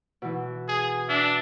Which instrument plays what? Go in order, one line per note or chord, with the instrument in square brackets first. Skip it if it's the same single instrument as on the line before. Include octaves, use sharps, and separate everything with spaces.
[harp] B2 E3
[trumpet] G#4
[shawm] D4 [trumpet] E5